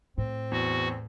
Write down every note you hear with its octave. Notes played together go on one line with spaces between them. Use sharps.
A2 C4
E2 F#4